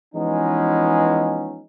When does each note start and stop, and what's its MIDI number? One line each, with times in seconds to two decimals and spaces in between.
0.14 1.62 52
0.14 1.62 53
0.14 1.62 56
0.14 1.62 59
0.14 1.62 61
0.14 1.62 63